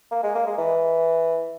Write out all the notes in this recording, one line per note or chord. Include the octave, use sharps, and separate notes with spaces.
A#3
G#3
A#3
G#3
E3